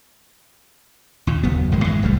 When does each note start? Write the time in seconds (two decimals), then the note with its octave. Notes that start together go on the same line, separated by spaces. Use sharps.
1.27 D#2 A#2
1.43 F#1 D#2 F#3 B3
1.72 A1 F#2 D#3 G#3
1.85 A2 E3 G#3
2.02 D1 C2 G3 A3